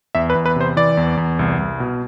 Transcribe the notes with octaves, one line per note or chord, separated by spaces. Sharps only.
E2 E5
B4
E2
B4
C3 C5
E3 D5
E2
E2
C2
C2
B2